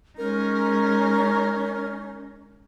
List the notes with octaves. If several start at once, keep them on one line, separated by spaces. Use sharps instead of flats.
G#3 C#4 D#4 A#4